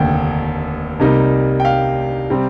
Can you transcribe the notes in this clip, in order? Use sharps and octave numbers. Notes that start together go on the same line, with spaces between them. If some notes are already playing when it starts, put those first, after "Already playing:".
Already playing: F1 D#2 D3 G5
C2 C3 G3 A#3 D#4
G5
F5
C3 G3 C4